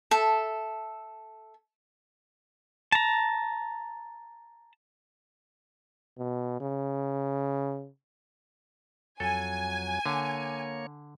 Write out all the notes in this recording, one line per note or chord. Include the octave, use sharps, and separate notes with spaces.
A4 E5
A5 A#5
B2
C#3
F2 F#3 A4 G#5
D3 A#3 C#5